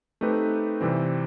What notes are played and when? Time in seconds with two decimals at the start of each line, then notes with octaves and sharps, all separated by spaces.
0.21 A3 C4 D#4 G4 B4
0.81 C3 E3 G3 C4